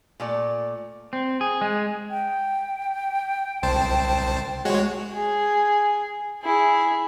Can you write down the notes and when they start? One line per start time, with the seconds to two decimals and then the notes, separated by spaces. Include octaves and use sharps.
0.20 A#2 A3 D5
1.13 C4
1.41 G#4
1.61 G#3
2.11 G5
3.63 C2 C5 A5
4.65 G#3 F#4 C#5
5.14 G#4
6.43 E4 G#4